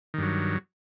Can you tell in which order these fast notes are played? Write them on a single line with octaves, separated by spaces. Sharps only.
D#3 G2 F#3